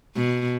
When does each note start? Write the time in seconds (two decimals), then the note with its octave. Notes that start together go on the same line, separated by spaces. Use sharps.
0.15 B2